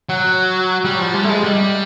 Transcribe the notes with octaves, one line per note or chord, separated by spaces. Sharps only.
F#3
G3
F3
G3
A3
G#3
G3